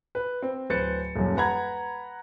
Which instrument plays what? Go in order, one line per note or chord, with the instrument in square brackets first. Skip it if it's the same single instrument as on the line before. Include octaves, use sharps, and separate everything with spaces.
[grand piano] B4
C4
D1 B4 C5 A6 C#7
D#1 F#2
B4 F#5 A#5 B5 G#6